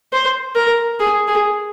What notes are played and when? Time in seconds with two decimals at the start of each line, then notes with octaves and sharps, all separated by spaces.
0.13 C5
0.56 A#4
0.99 G#4
1.28 G#4